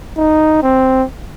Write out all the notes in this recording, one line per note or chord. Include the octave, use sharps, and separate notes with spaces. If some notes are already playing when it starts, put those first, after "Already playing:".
D#4
C4